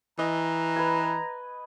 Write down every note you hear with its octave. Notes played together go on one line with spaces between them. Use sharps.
E3 D#5 A#5
B4 G#5